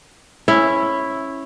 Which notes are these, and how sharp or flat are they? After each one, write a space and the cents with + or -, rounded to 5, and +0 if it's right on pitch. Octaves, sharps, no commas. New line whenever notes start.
C#4 -15 E4 +0